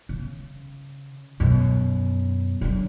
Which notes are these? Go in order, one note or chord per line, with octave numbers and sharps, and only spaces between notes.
C#3
F#2 B2
D3 F#3